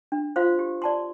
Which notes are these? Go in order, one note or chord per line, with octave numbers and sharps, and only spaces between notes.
D4
F4 C5 F5 C6
G4
D5 A5 C6